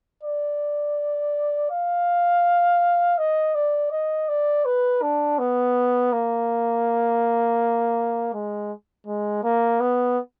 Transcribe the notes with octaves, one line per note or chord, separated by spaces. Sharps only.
D5
F5
D#5
D5
D#5
D5
B4
D4
B3
A#3
G#3
G#3
A#3
B3